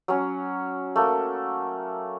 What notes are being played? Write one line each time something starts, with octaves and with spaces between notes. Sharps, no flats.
F#3 C#4
A3 A#3